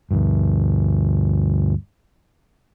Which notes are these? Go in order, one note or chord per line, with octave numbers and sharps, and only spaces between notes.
D2 G2